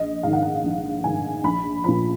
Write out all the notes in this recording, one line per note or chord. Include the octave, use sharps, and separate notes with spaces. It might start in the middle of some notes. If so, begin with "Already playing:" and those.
Already playing: A#1 D#5
G#2 D#3 F5
F#5
F5
A#1
G#2 D#3 G#5
A#1 B5
A#2 F3 B5